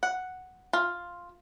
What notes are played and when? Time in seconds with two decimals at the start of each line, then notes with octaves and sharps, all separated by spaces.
0.03 F#5
0.73 F4